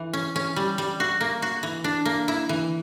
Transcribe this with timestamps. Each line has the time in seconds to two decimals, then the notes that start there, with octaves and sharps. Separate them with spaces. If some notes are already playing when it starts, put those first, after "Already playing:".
Already playing: E3
0.13 C#4
0.36 C#4
0.56 G3
0.78 G3
1.00 F#4
1.21 A#3
1.42 F#4
1.63 E3
1.84 D4
2.05 A#3
2.28 E4
2.49 E3